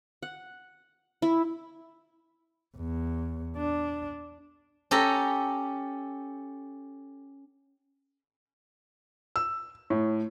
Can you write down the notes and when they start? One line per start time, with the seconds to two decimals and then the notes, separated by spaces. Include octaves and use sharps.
0.23 F#5
1.22 E4
2.77 E2
3.57 D4
4.91 C#4 G4 A4 A#5
9.36 E6
9.90 A2